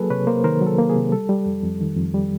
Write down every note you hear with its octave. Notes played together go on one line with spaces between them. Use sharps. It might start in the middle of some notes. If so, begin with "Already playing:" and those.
Already playing: F#3 A#3 G#4 A4 B4
C3 B4 C#5
A#3 A#4 C5
D#3 A#4 C5
F#3
A4
A#3
G#4
C3
G3 A4
G3
F2
F2
D#3
F2
G3